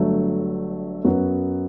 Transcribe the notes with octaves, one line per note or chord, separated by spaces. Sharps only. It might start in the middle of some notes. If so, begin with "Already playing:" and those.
Already playing: G1 G2 F#3 A3
F#2 F#3 B3 F#4